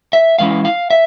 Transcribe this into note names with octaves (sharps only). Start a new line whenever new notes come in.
E5
A2 E3 G#3 C#4 E4 F5
F5
E5